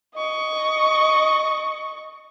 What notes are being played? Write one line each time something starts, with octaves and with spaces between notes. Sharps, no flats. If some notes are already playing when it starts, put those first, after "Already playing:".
D#5 C#6